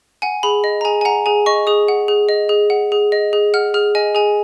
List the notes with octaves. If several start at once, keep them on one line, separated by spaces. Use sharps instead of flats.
F#5 G#5
G#4 B5
D#5
A#5
G#4 G#5
G#5
F#5 A#5
G#4 G#5
D#5 C#6
G#4 D#6
F#5
G#4
D#5
G#4
F#5
G#4
D#5
G#4
F#5 F6
G#4 F6
D#5 G#5
G#4 G#5